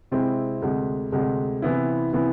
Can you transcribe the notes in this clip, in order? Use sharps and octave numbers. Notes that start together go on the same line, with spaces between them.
C3 G#3 C4 E4
D2 C3 G#3
D2 C3 G#3
C3 E3 B3 E4
C3 E3 B3 E4